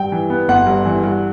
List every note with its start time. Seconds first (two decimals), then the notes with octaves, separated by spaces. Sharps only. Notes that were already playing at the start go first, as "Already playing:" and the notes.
Already playing: G2 G5
0.12 E3
0.30 B3
0.48 G1 F#5
0.67 G2
0.85 E3
1.04 G2